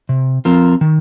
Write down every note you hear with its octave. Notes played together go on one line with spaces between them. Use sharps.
C3
F3 C4 F4 A#4
D#3